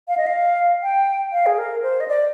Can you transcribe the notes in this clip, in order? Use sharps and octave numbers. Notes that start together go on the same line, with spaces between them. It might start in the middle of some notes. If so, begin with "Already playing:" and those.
F5
D#5
F5
G5
F5
G#4
A#4
C5
D#5
D5